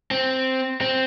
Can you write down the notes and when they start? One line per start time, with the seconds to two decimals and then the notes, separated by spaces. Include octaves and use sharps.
0.11 C4
0.81 C4